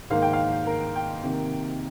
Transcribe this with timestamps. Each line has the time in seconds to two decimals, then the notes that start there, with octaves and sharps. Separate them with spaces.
0.10 G#2 D#3 A#3 F5
0.22 G5
0.33 F5
0.66 A#4
0.96 G5
1.23 C3 D#3 A#3